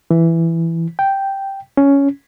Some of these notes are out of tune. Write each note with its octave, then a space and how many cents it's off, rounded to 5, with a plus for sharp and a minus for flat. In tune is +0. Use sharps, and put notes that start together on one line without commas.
E3 +10
G5 -5
C#4 +10